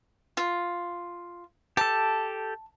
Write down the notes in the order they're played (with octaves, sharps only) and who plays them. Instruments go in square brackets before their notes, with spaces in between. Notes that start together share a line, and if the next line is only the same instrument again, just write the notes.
[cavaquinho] F4
[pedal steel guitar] G4 A4 [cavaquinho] A5